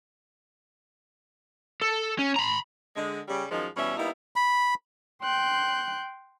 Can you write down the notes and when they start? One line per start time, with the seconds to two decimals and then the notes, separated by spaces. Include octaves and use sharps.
1.82 A4
2.19 C#4
2.36 A#5 B5
2.96 D3 G#3
3.28 C#3 G3
3.51 F#2 D#3 F3 G#3 D#4
3.77 B2 E3 G3 C#4 E5
3.97 G3 A#3 B3 D#4 E4
4.36 B5
5.22 G5 C6 F#6 G6